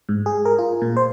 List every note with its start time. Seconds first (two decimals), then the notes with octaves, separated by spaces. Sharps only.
0.09 G#2
0.26 G#4
0.45 A#4
0.59 F4
0.82 A#2
0.97 C5